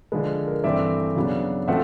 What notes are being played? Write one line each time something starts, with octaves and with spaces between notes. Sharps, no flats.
D3 F3 G#3 B4
A#4
G2 E3 A3 C4 D5 E5
C#3 F#3 B3 D4
F3 A3 C4 E5 F#5